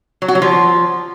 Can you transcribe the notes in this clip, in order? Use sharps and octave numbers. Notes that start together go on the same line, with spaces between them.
F#3
F#4
F#3
F3